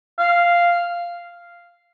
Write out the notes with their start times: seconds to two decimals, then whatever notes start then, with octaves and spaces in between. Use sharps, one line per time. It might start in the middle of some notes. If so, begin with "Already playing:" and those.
0.19 F5